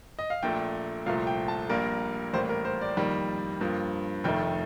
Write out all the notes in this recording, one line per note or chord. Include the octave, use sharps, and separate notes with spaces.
D#5
F5
A#1 A#2 A3 G5
C2 A#2 F3 A3 F5
G5
A5
A#1 A#2 G3 A#3 A#4
A1 A2 G3 A#3 C5
A#4
C5
D5
F2 D#3 G3 A#3
G2 F3 A#3
F1 F2 D#3 A3 G5